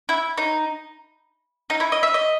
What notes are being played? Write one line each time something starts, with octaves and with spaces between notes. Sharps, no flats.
E4
D#4
D#4
E4
D#5
E5
D#5